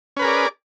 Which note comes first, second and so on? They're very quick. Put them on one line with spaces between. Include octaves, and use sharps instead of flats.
C#4 B4 A#4 G#4 D5